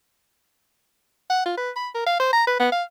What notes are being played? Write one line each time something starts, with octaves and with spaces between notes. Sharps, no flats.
F#5
F4
B4
B5
A#4
F5
C5
A#5
B4
B3
F5